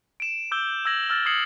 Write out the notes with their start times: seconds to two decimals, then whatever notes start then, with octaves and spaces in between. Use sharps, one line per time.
0.20 D7 E7
0.51 D6 E6 G6 G7
0.85 E6 G6 G#6 A#6 F#7
1.10 E6 F6 A6
1.26 D#6 E6 G#6 C7 C#7 F#7